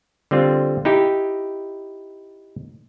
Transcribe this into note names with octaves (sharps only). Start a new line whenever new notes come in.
D3 G3 C4 F4
D#4 E4 G4